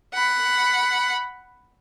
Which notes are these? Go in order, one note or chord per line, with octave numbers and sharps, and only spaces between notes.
F#5 B5